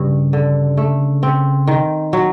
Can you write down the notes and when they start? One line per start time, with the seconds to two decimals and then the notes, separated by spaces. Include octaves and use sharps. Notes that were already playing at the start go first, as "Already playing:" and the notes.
Already playing: G2 C#3
0.33 D3
0.77 A3
1.23 C4
1.68 D#3
2.13 F#3